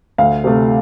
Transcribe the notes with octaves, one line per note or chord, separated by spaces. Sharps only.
D2 F5
C3 A3